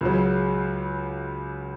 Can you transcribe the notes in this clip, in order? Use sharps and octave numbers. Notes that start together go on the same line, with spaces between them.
C#2 C#3 F#3